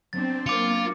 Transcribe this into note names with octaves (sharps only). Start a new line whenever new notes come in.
F#3 B3 C4 D4 A6
A#3 C4 F4 D6 C#7